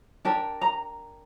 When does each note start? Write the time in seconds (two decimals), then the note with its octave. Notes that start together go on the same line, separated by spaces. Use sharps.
0.25 D4 G4 A#4 A5
0.61 A#5